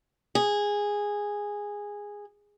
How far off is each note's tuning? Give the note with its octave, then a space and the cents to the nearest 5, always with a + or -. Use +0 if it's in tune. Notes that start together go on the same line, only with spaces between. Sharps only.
G#4 -10